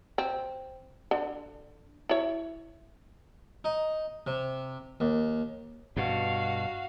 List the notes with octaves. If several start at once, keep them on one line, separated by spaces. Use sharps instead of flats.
C4
D3
E4 C#5
D#4
C3
D#2
G2 B2 F#4 F5